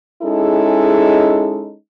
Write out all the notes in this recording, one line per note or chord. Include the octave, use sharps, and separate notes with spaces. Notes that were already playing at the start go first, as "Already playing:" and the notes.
G#3 C#4 D#4 E4 G#4 A4